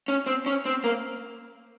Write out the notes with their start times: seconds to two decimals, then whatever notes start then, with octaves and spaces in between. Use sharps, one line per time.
0.08 C#4
0.26 C4
0.46 C#4
0.66 C4
0.84 A#3